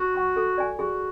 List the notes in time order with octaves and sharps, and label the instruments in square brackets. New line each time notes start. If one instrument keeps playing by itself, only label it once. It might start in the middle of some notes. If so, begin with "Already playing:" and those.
Already playing: [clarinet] F#4
[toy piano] F#5 C#6
A4
D5 G#5
[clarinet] F#4 [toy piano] G#4